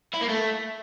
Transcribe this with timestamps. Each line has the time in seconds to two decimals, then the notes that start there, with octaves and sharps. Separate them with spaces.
0.14 E4
0.22 A#3
0.29 A3